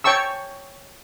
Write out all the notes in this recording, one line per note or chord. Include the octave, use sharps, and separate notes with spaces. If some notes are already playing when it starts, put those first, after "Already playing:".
C#5 G5 A5 C#6 E6